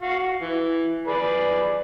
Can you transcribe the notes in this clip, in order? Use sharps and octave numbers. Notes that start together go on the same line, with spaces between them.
F#4 F5
E3
G#4 B4 D5